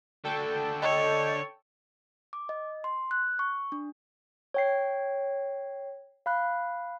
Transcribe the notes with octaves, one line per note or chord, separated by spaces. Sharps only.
D3 F#4 A4 G5 A5
C#5 D#5
D6
D#5
C6
F#6
C#6
D4
C#5 G5 C7
F5 B5 F#6